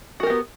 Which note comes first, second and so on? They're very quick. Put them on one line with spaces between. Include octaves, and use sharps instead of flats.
F#4 A#4 G4 B3